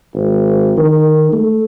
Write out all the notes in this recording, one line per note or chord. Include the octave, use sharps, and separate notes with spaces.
G#1
D#3
A3